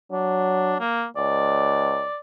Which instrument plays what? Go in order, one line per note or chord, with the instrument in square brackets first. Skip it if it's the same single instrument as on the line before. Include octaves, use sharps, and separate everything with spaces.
[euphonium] F#3 [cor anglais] D4
[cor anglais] A#3
[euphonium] C#2 [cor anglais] D5